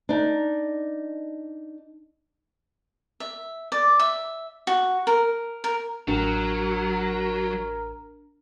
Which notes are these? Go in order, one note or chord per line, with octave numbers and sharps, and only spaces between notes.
D4 D#4
E5
D5
E5
F#4
A#4
A#4
A1 F#3 D4 A#4